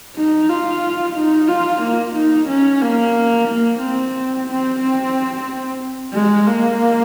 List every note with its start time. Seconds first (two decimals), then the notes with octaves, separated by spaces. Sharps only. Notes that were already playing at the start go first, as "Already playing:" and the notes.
0.16 D#4
0.49 F4
1.15 D#4
1.48 F4
1.82 A#3
2.16 D#4
2.49 C#4
2.82 A#3
3.48 A#3
3.80 C4
4.48 C4
4.80 C4
6.13 G#3
6.46 A#3